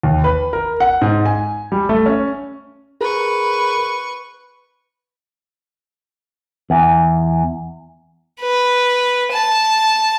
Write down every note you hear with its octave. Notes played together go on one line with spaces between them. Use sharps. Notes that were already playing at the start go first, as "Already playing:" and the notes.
D#2
B4
A#4
F#5
G#2
G#5
G3
A3
C#4
G#4 A#4 B4 C#6
E2
B4
A5